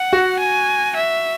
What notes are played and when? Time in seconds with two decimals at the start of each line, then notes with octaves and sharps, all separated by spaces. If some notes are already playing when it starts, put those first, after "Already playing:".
Already playing: F#5
0.13 F#4
0.40 G#5
0.96 E5